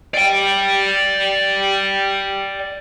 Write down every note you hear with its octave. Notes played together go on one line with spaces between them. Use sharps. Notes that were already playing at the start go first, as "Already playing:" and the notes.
D5 G5